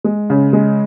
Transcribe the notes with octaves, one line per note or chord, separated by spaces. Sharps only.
G#3
C#3
G#3